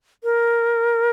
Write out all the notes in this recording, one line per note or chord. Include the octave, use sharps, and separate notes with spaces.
A#4